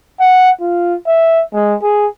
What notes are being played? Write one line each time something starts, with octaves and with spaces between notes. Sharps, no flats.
F#5
F4
E5
G#3
G#4